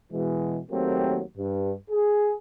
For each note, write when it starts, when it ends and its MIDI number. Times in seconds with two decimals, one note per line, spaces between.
0.12 0.59 47
0.12 0.59 52
0.12 0.59 56
0.71 1.22 39
0.71 1.22 54
0.71 1.22 57
0.71 1.22 58
0.71 1.22 60
0.71 1.22 67
1.37 1.73 43
1.90 2.35 68